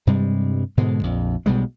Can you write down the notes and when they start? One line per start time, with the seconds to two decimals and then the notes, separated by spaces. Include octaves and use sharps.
0.07 G2 C3 G3 G#3
0.77 G#2 B2 D3 G#3
1.03 A#1 F2
1.46 B1 B2 G3 G#3